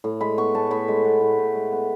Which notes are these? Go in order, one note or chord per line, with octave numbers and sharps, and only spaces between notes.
A2
G#3 B5
B3 C#6
A2 A5
A2 B5
G#3
B3
A2
A2
G#3
B3